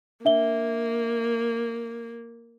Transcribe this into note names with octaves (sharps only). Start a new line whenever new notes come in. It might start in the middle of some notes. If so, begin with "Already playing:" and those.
A#3 D4 E5 G7